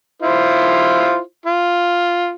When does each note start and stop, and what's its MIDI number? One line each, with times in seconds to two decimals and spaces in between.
0.22 1.19 64
0.22 1.19 65
0.22 1.19 72
1.46 2.35 65